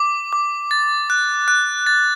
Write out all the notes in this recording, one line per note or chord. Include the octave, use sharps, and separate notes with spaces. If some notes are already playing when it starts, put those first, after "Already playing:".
Already playing: D6
D6
A6
F#6
F#6
A6